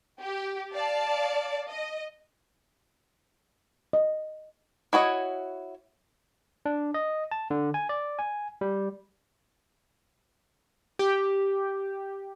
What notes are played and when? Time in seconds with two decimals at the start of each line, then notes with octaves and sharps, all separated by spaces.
0.22 G4
0.74 D5 F5 A5
1.69 D#5
3.93 D#5
4.93 E4 F#4 C#5 D#5
6.66 D4
6.94 D#5
7.31 A5
7.51 D3
7.74 G#5
7.89 D5
8.19 G#5
8.61 G3
10.99 G4